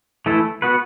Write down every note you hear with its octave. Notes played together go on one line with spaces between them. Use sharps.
E3 A3 E4 A4
B3 F#4 B4